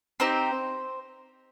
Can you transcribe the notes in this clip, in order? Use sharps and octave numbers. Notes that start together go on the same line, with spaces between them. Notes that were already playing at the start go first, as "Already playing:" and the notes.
C4 D#4 G4 C5